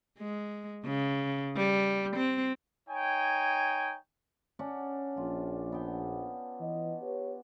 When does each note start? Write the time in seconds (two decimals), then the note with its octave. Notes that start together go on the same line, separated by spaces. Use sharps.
0.18 G#3
0.85 C#3
1.56 G3
2.16 C4
2.90 D#4 C#5 G5 G#5
4.59 C#4 D4 F#5
5.17 A#1 F4
5.72 B3 G5
6.61 E3 D#5
7.02 G4 B4 C#5